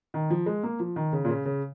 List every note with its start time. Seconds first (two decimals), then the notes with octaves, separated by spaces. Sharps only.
0.14 D#3
0.30 F3
0.46 G#3
0.63 A#3
0.80 F3
0.96 D#3
1.13 C#3
1.24 A#2
1.29 C#3
1.45 C#3